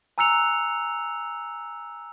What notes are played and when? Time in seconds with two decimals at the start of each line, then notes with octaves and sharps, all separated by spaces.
0.18 G#5 A#5 E6 F#6 C#7 F7